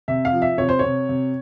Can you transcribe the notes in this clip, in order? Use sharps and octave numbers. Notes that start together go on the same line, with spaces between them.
C3 E5
F5
F3
E5
C3 C#5
C5
C3 C#5
C3